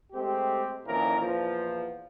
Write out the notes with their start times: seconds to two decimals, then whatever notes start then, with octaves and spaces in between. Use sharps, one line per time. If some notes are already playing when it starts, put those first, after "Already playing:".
0.13 G#3 A3 C4 G4
0.86 F2 A#2 D#3 E3 C#4 A#4
1.20 E2 A#2 F3